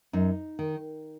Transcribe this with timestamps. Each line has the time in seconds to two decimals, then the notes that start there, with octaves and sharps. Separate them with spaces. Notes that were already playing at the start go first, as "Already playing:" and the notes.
0.13 F#2 D#4
0.59 D#3